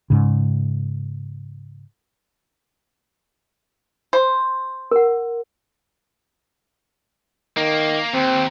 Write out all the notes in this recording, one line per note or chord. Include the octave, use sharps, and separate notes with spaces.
G#2 C#3
C5
A#4 F#5
D#3 A#3
D#2 C4